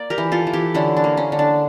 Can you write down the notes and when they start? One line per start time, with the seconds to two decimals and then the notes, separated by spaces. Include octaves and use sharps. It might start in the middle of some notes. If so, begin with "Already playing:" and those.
Already playing: A#3 D5
0.10 G4 A#4
0.18 E3
0.32 F4 A4
0.47 E3
0.53 E4 G4
0.74 D3 C#4 E4
0.97 D4
1.04 A#3
1.17 C#4
1.32 D3
1.39 D4